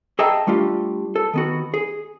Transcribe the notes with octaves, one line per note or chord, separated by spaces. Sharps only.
G#4 D#5 E5 G5 A5 A#5
G3 A3 D4 F4 G4
A4
D#3 B3 F#4
G#4